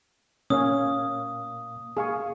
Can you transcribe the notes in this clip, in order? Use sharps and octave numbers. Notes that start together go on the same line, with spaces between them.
A#2 A#3 C#4 F5 D#6
A#3 G#4 F5 C#6